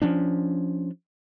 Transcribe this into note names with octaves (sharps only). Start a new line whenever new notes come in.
F3 C#4 D4